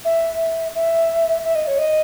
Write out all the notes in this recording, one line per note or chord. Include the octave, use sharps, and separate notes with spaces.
E5
E5
E5
D#5
C#5
D#5